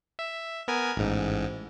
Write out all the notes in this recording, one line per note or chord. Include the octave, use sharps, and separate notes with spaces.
E5
B3 A#4 G#5
A1 G#2